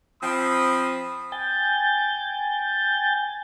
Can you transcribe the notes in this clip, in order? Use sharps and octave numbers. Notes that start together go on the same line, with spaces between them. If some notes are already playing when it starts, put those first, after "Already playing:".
F3 C4 B5 D#6
G5 G#5 G6 A6